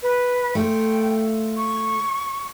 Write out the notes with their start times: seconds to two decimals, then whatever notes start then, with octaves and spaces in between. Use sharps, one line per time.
0.03 B4
0.55 A3 F4 G5
1.57 C#6